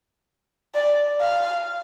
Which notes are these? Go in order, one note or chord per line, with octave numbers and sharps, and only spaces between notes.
D5
F5